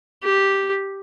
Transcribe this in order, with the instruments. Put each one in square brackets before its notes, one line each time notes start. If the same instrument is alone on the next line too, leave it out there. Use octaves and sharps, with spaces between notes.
[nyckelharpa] G4